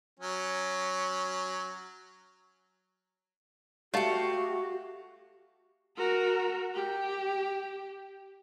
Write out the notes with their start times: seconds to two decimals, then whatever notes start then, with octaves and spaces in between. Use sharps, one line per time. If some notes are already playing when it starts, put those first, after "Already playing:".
0.20 F#3 C#4
3.94 A3 F#4 G4 F5 F#5 A5
5.97 F#4 A#4
6.74 G4